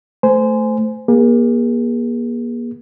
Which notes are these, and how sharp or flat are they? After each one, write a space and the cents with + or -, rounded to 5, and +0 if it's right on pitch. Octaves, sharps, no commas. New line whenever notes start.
A3 +0 C5 -15 G#5 +0
A#3 +35 G#4 -25